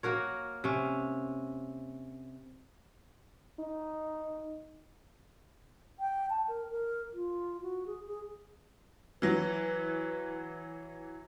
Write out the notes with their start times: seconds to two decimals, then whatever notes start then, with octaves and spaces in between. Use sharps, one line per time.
0.03 A#3 F#4 A#4 C#5
0.64 C3 C#4
3.59 D#4
6.00 G5
6.30 A5
6.48 A#4
6.71 A#4
7.14 F4
7.62 F#4
7.86 G#4
8.08 G#4
9.22 E3 F#3 B4